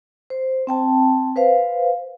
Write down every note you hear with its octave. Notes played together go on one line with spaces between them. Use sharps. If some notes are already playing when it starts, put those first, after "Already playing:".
C5
C4 G5 A5
B4 C5 F5